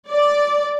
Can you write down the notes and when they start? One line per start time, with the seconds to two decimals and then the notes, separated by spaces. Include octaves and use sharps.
0.11 D5